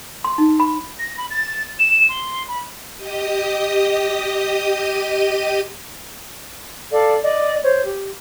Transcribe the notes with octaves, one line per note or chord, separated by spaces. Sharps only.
C6
D#4
B5
A#6
B5
A6
E7
C6
B5
G4 D#5 D#6
A4 D5 F5
D5 D#5
C5 C#5
G4